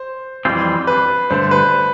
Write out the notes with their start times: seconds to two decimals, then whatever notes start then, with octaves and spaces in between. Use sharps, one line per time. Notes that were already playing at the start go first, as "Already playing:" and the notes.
Already playing: C5
0.45 F2 E3 G3 C4 F4
0.87 B4
1.30 G2 D3 A3 C5
1.51 B4